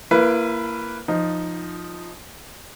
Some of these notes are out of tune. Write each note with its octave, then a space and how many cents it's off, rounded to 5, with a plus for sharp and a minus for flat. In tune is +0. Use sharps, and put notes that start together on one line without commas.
A#3 +0 E4 +35 B4 +0
F3 +0 D#4 +0